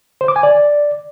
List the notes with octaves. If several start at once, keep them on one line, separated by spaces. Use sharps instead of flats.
C5
D6
G#5
D5